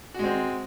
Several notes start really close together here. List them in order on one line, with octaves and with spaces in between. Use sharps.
F#4 G#3 C4